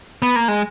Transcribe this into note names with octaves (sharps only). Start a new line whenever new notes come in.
B3
A#3
G#3